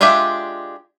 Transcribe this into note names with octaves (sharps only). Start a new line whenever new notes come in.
G#3 D4 F4 G4 E5